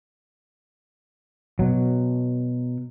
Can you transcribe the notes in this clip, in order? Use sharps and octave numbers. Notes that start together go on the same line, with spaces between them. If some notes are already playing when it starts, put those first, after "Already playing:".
B2 F#3